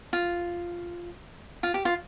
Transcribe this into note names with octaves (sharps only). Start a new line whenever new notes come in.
F4
F4
G4
F4